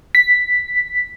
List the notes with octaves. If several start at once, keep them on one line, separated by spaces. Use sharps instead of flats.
B6